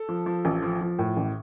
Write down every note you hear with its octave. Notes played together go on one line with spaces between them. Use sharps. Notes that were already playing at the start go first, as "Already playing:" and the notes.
Already playing: A4
F3
F3
A1
F3
F3
A2
A1